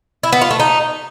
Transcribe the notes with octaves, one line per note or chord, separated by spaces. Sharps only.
E4
B3
F4
A3
D#4